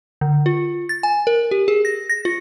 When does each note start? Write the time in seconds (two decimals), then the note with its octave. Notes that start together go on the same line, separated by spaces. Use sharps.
0.21 D3
0.46 F4
0.89 A6
1.03 G#5
1.27 A#4
1.51 G4
1.68 G#4
1.85 A#6
2.10 A#6
2.25 F4